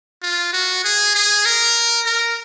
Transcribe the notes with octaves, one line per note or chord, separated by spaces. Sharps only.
F4
F#4
G#4
G#4
A#4
A#4